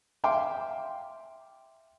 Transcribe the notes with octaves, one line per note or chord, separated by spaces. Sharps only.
E5 F5 G5 C6 D6